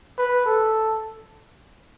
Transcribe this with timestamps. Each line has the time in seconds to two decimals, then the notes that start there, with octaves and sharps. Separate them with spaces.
0.18 B4
0.46 A4